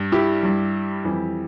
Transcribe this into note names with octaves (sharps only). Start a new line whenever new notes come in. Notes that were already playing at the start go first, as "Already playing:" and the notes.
Already playing: G2 G3
E4 G4
G2 G3
F2 E3 G3